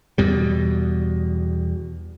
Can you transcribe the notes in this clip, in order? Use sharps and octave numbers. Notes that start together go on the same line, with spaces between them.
E2 B2 G3